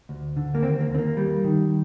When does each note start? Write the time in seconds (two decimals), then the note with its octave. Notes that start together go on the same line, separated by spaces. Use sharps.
0.09 D2
0.37 D3
0.55 A#3
0.62 D#2 C4
0.81 A#3
0.90 D#2 C4
0.98 A#3
1.17 G3
1.44 D#3